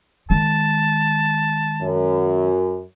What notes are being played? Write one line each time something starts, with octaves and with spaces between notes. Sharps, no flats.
D#3 G#3 A5
F#2